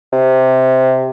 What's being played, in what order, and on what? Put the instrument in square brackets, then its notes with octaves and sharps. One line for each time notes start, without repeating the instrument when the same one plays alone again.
[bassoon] C3